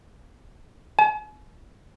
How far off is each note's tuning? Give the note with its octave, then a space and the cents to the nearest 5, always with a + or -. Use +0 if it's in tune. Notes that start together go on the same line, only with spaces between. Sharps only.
G#5 +40